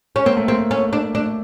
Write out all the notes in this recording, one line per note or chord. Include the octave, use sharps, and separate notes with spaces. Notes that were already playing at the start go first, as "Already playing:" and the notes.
C#4
A#3 C4
A3
A#3 C4
A3 C#4
D4
A3 D4